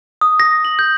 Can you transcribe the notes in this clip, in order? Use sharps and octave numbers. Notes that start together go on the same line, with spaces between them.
D#6
A#6
F#7
G6